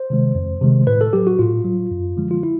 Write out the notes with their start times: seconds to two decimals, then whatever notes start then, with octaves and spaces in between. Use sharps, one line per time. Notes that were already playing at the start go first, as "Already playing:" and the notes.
Already playing: C5
0.10 C3 D#3 G#3
0.35 F2
0.62 C3 D#3 G#3
0.87 A2 B4
1.01 A4
1.13 F#3 G4
1.27 F#4
1.39 A2 F4
1.64 F#3
1.91 F#2
2.17 D3 F3 G#3
2.31 F4
2.43 E4